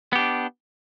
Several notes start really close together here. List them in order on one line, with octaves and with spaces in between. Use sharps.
B3 G4 D4